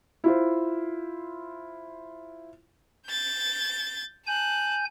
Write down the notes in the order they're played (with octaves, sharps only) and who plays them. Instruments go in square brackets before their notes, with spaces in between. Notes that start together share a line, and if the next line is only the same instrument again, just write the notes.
[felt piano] E4 F4 C5
[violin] G6 A6
[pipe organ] G#5 G6 [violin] A5 F#6